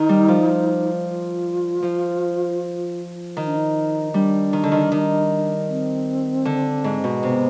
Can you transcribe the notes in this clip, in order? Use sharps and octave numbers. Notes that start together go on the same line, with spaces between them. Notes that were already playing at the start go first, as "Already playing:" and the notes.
Already playing: D#3 D#4
G3
F3
F4
F3
D#3 D#4
D4
D#4
G3 D4
D#3
D3
D#3
D#3
C4
D3
G#2
B2
C3 B3